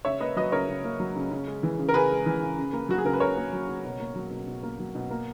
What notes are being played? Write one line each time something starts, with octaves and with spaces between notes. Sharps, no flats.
C#3 C#5 E5
A#3 B4 D#5
F#3 B4 D#5
C#3 A#4 C#5
C#3
A#3
F#3
C#3
C#3
G#3
E3
C#3
A#4
C#3 G#4 B4
G#3
E3
C#3
C#3
A#3
F#3 F#4
G#4
C#3 A#4
B4
C#3 A#4 C#5
A#3
F#3
C#3
B2
A#3
F#3
B2
B2
A#3
F#3
B2
A#3